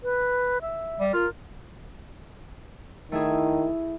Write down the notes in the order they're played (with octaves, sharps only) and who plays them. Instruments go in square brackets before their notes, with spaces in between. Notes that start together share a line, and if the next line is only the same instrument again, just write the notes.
[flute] B4
E5
[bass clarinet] G3
[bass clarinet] F4 [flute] A#4
[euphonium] D#3 [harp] A3 E4 G#4